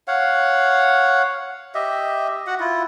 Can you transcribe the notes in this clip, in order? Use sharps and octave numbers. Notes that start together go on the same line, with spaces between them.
C#5 F5 F#5
G4 D#5 E5
F#4 F#5
E4 F4